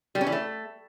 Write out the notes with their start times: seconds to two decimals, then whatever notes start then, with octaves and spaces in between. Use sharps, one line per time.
0.15 G3
0.21 C#4
0.27 E3
0.32 A3